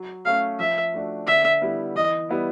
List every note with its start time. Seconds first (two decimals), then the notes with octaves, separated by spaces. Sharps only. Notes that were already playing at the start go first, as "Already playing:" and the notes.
Already playing: F#3
0.25 A3 C#4 F5
0.59 F3 E5
0.94 A3 D4 F#4
1.27 D3 E5
1.62 G3 B3 E4
1.95 E3 D#5
2.29 G3 B3 E4